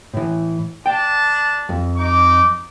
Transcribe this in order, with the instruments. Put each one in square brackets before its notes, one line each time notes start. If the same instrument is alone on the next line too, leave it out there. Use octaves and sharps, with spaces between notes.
[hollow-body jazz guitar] A2 E3
[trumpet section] D4 A5 [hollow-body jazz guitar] G5
[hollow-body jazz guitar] F2
[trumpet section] D#4 D6